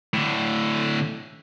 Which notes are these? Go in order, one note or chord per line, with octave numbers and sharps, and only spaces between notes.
A2 D3